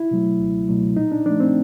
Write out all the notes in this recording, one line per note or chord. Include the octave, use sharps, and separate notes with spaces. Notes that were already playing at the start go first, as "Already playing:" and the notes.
Already playing: E4
B2 F#3 A3
C#2
B2 F#3 A3
A#2 D#4
D4
F3 A3 D4
C4